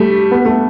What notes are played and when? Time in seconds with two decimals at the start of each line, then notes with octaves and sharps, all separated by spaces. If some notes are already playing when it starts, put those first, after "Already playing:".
Already playing: G3 A3
0.31 B3
0.45 A3